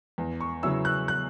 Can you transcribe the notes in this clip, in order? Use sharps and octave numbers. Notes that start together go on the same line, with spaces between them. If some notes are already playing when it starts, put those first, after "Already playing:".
E2
C#6
C#3 F#3 C#4 E4 E6
F#6
F#6